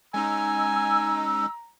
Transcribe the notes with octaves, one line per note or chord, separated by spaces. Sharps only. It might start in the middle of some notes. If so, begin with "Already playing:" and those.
G#3 C#4 D#4 G#5 A#5 E6